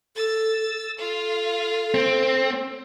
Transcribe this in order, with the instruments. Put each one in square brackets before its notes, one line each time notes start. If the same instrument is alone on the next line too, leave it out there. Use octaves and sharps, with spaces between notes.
[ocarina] A4 [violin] E6 A6
[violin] F4 F5 [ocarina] A4
[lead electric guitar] C4